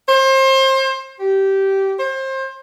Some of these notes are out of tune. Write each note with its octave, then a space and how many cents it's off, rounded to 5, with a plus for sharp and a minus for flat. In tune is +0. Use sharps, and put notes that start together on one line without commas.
C5 +30
G4 -15
C5 +30